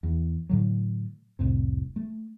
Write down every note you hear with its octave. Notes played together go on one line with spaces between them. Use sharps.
E2
A2 D3 F#3
F1 C2 A2 C3
A3